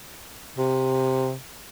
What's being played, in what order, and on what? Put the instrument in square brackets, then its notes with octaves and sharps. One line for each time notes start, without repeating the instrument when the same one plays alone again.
[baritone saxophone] C3